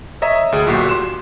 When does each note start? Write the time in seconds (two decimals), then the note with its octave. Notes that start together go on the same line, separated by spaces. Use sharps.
0.22 C#5 D#5 E5 A#5
0.52 D2 G#4
0.66 B1 A#2 F#4 G4 C7
0.89 C6 E7